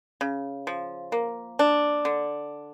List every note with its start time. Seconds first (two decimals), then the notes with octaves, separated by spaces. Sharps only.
0.21 C#3
0.67 F3
1.12 A#3
1.59 D4
2.05 D3